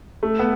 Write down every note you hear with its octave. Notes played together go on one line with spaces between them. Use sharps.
A3
B3